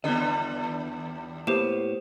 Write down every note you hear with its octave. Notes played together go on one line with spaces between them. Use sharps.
D#2 D3 G3 B3 D4 D#5
A2 A#3 B3 G4 C5 E7